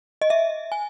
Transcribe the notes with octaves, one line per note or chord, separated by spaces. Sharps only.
D#5
E5
G#5